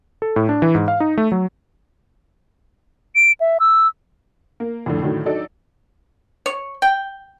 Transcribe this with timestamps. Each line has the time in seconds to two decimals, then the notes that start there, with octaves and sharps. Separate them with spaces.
0.22 A4
0.36 A2
0.49 D4
0.62 E3
0.75 G#2
0.88 F5
1.00 D#4
1.17 A3
1.32 F#3
3.15 D7
3.40 E5
3.60 E6
4.60 A#3
4.86 F2 A2 D3
5.02 A2 D3 D#3 F#3
5.25 F#3 D4 D#4 A4 D5
6.46 C#5
6.82 G5